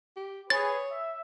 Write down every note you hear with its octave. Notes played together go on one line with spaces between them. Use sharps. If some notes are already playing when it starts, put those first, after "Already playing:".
G4
G#4 B4 C#5 A6
E5